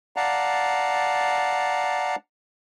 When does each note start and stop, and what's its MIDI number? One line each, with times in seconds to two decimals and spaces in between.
0.16 2.16 74
0.16 2.16 77
0.16 2.16 78
0.16 2.16 81
0.16 2.16 82